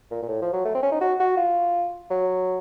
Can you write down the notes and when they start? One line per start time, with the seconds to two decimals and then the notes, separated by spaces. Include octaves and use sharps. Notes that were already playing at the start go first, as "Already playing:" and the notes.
0.11 A#2
0.23 A#2
0.29 A2
0.42 F3
0.53 F#3
0.65 A3
0.75 C4
0.83 C#4
0.92 D#4
1.01 F#4
1.20 F#4
1.37 F4
2.10 F#3